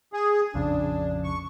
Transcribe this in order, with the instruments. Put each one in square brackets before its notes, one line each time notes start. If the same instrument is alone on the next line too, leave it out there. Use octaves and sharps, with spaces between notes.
[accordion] G#4
[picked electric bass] A#1 F2 C#3 [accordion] D4
[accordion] C#6